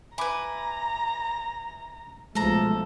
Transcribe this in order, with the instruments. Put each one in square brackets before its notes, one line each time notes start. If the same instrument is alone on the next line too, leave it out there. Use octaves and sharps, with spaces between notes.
[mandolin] E4 B4 [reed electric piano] G#5 B5 D6 [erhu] A#5
[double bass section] B1 F3 A3 [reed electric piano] G#3 [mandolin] A4 A#5